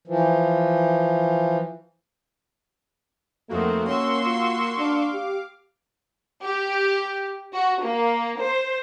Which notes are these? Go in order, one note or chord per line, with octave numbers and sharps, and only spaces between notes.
E3 F3
F2 D#3 A3 A#3 C4 F#4
C#4 C6 C#6 E6
F4
D4 F5 D6
G4
G4
F#4
A#3
C5